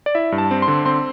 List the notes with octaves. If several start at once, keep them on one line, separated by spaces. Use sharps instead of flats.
D5
E4 E5
G2
A5
C4
C6
D3
C4 C6